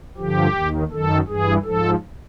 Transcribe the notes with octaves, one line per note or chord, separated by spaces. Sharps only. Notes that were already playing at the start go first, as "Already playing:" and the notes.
G2 D3 F3 G4
D#2 D#3
F#2 D#3 A4
G2 E3 G#4
G#2 F3 A4